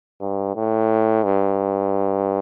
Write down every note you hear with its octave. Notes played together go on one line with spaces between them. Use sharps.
G2
A2
G2